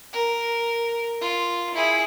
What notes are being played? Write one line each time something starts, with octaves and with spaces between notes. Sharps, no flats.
A#4
F4
E4 G#4